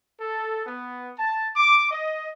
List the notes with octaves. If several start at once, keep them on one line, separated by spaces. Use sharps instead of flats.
A4
B3
A5
D6
D#5